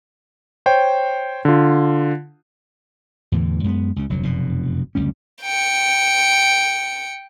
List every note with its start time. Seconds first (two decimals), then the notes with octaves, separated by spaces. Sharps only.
0.66 C5 C#5 G5
1.45 D3 F4
3.32 E2 A2 D3 E3
3.64 F#2 G#3 A#3 B3
3.96 C#2 C#3
4.09 F1 D2 F#3
4.23 F1 F#2 B2
4.95 F#1 D2 G3 C#4
5.43 G5 C#7